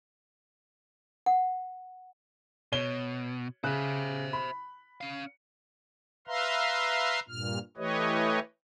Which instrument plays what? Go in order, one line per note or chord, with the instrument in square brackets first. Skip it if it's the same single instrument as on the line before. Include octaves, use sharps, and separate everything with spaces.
[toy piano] F#5
[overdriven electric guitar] B2 [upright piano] C#5 G7
[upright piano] C#3 F#6 [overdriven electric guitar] C5 E5
[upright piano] B5
[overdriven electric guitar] C#4 F5
[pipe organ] B4 E5 F5 A#5 C6
G2 A#2 F6
E3 A3 G4 B4 C#5 D#5